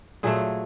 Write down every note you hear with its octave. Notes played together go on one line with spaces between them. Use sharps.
A#2 F#3 A3 G#4